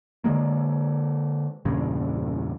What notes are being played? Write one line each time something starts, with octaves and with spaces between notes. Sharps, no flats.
D3 E3 G#3 A#3
E2 G2 A#2 C#3